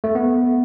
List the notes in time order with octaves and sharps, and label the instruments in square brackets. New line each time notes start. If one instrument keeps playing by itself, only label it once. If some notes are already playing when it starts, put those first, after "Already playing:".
[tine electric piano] A3
B3